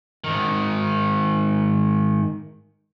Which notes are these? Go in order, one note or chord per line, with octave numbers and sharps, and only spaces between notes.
G#2 D#3